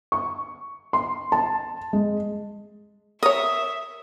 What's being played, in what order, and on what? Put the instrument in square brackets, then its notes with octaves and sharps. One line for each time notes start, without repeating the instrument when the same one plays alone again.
[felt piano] C#6
C6
A5
G#3
[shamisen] A#4 C#5 [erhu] E5 [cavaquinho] D#6